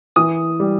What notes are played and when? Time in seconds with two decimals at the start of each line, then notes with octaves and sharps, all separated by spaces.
0.16 E3 D#6
0.60 G3